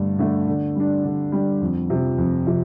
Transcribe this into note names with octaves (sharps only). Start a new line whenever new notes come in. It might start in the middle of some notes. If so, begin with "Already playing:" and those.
Already playing: G2 D3 A3
D3 A3
D3
G3 D4
D3
G3 D4
F2
C3 F3
F2
C3 F3